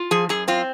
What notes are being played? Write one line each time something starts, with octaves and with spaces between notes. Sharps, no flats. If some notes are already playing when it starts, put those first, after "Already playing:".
Already playing: F4
F3 G#4
F#2 G#4
C4 F4